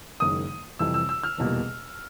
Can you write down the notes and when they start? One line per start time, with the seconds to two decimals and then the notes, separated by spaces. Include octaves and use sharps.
0.20 F#1 F#2 D#3 G#3 D#6
0.79 F2 C3 E3 G3 E6
0.94 E6
1.09 E6
1.23 F6
1.38 F1 E2 B2 G3 A#3